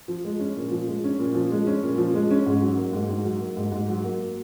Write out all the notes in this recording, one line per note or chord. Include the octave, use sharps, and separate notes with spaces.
F3
G#3
C#4
A#2
F3
G#3
C#4
A#2
F3
G#3
C#4
A#2
F3
G#3
C#4
G#2
F#3
A#3
G#2
G#2
F#3
A#3
G#2
G#2
F#3
A#3